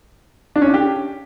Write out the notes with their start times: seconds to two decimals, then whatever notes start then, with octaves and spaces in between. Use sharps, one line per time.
0.56 D4
0.62 C#4
0.68 D4
0.74 G4